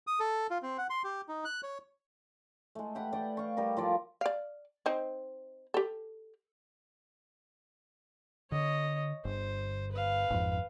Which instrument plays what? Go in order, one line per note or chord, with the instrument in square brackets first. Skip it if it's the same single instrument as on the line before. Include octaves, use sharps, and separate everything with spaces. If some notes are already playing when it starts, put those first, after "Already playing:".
[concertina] D#6
A4
F4
C4
F#5
C6
G4
D#4
F#6
C#5
[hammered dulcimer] G#3 A3
G4 F#5 B5
D5 F#5 G5
F5 C#6
G3 A4 A#4
F3 F4 D5
[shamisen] D5 F5
C4 D#4 C5
G4 A4
[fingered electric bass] D3 [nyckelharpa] C#5 D#5
[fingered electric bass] G1 [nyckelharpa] C5
[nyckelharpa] B4 F5
[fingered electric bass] G#1 F2